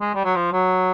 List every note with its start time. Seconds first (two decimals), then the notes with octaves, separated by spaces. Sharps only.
0.01 G#3
0.15 G3
0.24 F#3
0.36 F3
0.52 F#3